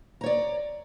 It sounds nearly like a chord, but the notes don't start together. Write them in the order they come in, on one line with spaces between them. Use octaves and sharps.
A#5 C#5 D5